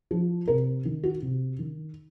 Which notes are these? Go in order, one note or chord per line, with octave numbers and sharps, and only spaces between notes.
F3
C3 A#4
D#3
F#4
C3
D#3